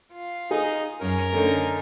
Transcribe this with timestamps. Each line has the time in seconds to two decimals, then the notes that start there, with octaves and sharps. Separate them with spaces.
0.11 F4
0.51 D#4 G#4
1.01 F#2 C#4 A#4
1.33 D3 A3 C#4 D#4